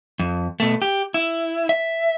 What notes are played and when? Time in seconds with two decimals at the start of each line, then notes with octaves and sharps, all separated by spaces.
0.19 F2
0.60 B2 A3
0.82 G4
1.14 E4
1.69 E5